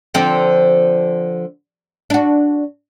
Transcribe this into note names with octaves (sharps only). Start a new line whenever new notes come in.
D3 F3 C4
D4 F#4